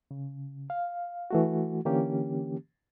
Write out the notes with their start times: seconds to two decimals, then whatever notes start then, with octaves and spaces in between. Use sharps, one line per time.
0.11 C#3
0.70 F5
1.31 E3 A3 F#4
1.85 D3 E3 A#3 C#4 G4